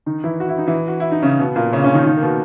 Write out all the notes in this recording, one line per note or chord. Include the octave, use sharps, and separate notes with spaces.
D#3 D#4
E3 E4
F#4
E4
D#4
E3 E4
F#4
E4
D#4
C#3 C#4
B2 B3
A#2 A#3
C#3 C#4
C#3 C#4
D#3 D#4
D#3 D#4
A#3
B2 B3